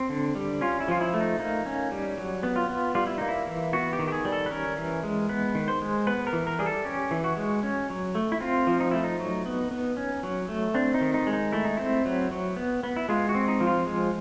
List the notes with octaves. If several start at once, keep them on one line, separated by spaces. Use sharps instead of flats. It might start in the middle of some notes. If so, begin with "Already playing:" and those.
Already playing: C4
D3
G3
C#4 F4
E4
F3 F4
E4
A3
D#4
A#3 D#4
C#4
G3
F#3
B3
F4
B3
G3 F4
E4
A#3 D#4
E4
E3
B3 F#4
G4
D#3
G4
G#4
G3
A4
B4
C#4 A#4
E3
G#3
B3 B4
D#3
C5
G#3
B3 B4
A#4
E3
A#4
G3 G#4
A4
C#4 G4
E3
F#4
G#3
C#4
F#3
A3
E4
C4 F4
F3
D#4
A3 E4
D#4
F#3
B3
B3
C#4
F#3
A3
C4 D4
D#4
D#3
D#4
G#3
D#4
A3 E4
D#4
C4 E4
F#3
F#3
B3
B3
E4
G#3 F4
F#4
C4
D#4
F3
F4
G#3